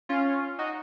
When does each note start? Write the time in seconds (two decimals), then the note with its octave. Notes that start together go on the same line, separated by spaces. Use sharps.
0.09 C#4 F4
0.59 D#4 F#4